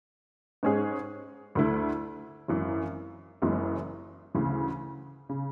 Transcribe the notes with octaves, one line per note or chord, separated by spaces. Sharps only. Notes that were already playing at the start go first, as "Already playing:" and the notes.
G#2 G#3 C#4 G#4
D2 D3 A3 E4
G#1 F#2 E3
F#1 F#2 E3 G#3
D2 C#3 E3
C#3